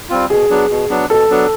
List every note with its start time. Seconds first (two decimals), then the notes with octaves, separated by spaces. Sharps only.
0.09 G3 C4 F4
0.30 B2 G#4
0.50 F#3 B3 D4
0.70 B2
0.90 F#3 B3 D4
1.10 B2 A4
1.30 F#3 B3 D4